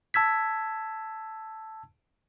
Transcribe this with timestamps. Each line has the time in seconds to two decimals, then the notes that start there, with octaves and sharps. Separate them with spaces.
0.14 A5 E6 G#6 B6